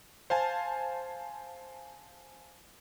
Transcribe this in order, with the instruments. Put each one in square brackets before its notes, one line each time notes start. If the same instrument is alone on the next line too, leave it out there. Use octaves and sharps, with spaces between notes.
[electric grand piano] C5 F5 G#5 A5